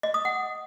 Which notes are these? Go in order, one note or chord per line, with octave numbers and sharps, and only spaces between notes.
D#5
D#6
F#5